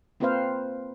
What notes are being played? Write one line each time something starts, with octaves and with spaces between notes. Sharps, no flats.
A#3 C4 F4 B4 C5 F5